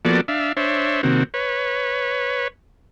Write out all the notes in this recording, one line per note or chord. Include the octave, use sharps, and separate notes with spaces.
F3 A#3 B3 F#4 A4 D5
D4 E5 F5
D4 C5 C#5 E5
C3 D#3 A#3 C4 F#4
B4 C#5